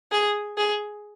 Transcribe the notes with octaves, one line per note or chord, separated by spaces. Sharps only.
G#4
G#4